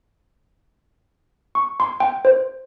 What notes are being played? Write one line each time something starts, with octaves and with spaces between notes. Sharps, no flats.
C#6
C6
G5
C5